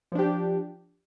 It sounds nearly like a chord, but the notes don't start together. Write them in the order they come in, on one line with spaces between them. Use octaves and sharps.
F3 D4 G4